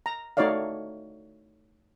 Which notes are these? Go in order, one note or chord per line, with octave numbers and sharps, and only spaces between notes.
A#5
A3 D#4 F#4 C#5 D5 F5